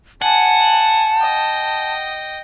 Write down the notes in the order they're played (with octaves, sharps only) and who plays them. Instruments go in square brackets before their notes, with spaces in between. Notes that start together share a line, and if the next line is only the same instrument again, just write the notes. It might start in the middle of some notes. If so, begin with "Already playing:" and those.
[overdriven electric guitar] F#5 [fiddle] G#5 [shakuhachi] A5
[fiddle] D#5 G5